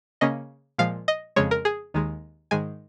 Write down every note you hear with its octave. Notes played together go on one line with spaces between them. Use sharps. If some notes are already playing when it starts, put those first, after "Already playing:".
C#3 A#3 C#4 D#5
A#2 F3 G#3 F5
D#5
F2 C#3 G#3 C#5
A#4
G#4
D#2 D#3 G#3
G#2 D#3 G#3 G#5